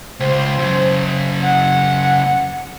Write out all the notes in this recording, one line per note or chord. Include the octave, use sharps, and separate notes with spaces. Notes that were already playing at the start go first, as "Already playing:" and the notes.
C#2 C5
F#2 C#3
F#5